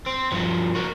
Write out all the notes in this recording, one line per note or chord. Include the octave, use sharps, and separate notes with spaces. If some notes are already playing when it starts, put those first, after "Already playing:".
C4
G2 F3
A#3 F#4